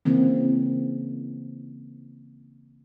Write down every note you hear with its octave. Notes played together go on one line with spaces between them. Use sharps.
C#3 E3 A#3 C4